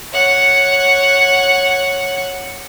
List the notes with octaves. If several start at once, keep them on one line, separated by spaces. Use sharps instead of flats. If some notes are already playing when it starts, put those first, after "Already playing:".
C#5 F#5